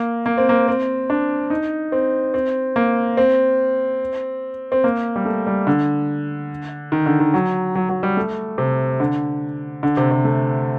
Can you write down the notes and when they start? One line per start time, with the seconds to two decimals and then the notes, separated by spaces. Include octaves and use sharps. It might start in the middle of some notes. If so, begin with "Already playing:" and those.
Already playing: A#3
0.26 A#3
0.38 C4
0.49 A#3
0.68 C4
1.10 D4
1.50 D#4
1.92 C4
2.34 C4
2.76 A#3
3.17 C4
4.72 C4
4.84 A#3
5.16 G3
5.25 A3
5.47 G3
5.67 D3
6.92 D#3
7.06 D3
7.20 D#3
7.34 F#3
7.75 F#3
7.89 F#3
8.03 G3
8.17 A3
8.58 C3
9.00 D3
9.83 D3
9.97 C3
10.11 C3
10.25 A3